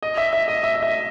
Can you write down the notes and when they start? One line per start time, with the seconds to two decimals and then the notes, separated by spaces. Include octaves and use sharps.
0.03 D#5
0.17 E5
0.33 E5
0.48 D#5
0.63 E5
0.75 D#5
0.83 E5